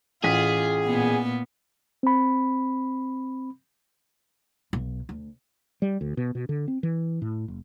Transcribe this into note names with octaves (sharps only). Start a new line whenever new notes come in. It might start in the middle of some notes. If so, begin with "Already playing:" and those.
A1 F4 G#4 B6
A#2 B3
C4 B5
B1
D2
G3
D2
B2
B2
D3
C4
E3
A2
F#1